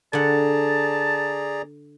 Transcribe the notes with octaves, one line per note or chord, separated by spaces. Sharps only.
D3 G#4 D5 F#5 A5 A#5